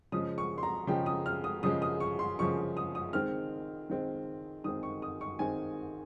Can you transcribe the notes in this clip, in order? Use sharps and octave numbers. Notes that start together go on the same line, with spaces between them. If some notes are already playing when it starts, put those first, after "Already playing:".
C#3 F3 G#3 D#6
C#6
C6
A#5
C#3 F3 G#3 G5
D#6
F6
D#6
C#3 F3 G#3 D#6
D#6
C#6
C6
C#3 F3 G#3 C#6
D#6
D#6
D#3 G#3 C4 F6
D#3 G#3 C4
D#3 G#3 C4 D#6
C#6
D#6
C#6
D#3 G#3 C4 G#5